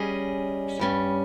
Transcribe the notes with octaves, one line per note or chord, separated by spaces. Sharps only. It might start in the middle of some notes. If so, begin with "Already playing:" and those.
Already playing: G3 C#4 G#4 D#5
G2 G3 C#4